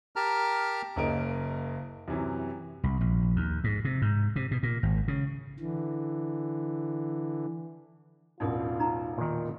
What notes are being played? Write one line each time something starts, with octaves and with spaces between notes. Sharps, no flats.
G4 A#4 A5 A#5 F6
F#1 C#3 A#3 A#4 D#5 D7
F#2 C3 E3
C2
A#1
D#2
G#2
C3
G#2
C3
B2
A#2
G#1
C#3
D3 E3
E1 A1 D#4 F4 A#4 D#6
D#4 A#5
A#2 D#3